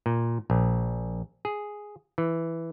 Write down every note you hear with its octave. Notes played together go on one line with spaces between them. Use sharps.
A#2
A#1
G#4
E3